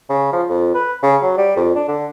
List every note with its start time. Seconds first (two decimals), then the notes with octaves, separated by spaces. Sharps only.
0.10 C#3
0.33 F3
0.50 F2
0.74 B4
1.03 C#3
1.22 F#3
1.37 G3
1.56 F2
1.75 D4
1.88 D3